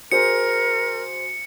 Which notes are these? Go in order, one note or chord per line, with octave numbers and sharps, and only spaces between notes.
F#4 G#4 A#4 C5 C#7